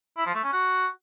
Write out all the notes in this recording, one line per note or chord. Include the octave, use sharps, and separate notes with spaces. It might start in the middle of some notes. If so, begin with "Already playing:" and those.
E4
F3
A3
C#4
F#4